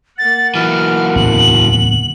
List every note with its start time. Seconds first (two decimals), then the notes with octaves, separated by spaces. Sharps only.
0.19 A#3 F#5 A6
0.55 E3 F#3 F6
1.16 D1 E2 C#3 F#7